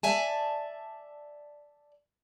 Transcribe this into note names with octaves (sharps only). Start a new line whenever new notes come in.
D5 E5 G#5 A5